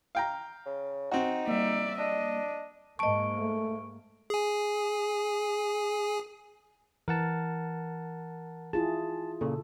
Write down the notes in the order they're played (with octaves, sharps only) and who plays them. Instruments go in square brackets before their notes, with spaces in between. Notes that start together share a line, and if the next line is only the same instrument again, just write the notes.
[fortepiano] F5 G5 A#5
[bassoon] C#3
[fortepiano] C4 F#4 [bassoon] D#4
[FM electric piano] G3 A#3 [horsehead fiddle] D5 E5
[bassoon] D4 [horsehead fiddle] D#5
[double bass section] G#2 A#3 [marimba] D#5 A5 [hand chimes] C#6 D7
[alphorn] A3
[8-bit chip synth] G#4 G#5
[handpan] E3 [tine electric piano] A#4 F#5 A5
[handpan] E4 F4 G#4 [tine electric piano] A5
[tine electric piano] A#2 C#3 [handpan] A4